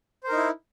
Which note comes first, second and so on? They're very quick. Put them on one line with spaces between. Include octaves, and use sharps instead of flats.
C5 A#4 D#4 E4